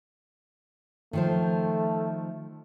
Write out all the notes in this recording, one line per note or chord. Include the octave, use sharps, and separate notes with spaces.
D#3 F3 A3 C5